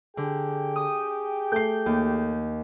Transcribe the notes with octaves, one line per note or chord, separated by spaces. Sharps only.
D3 G4 G#4 G5
D#6
A3 G6 C7
D#2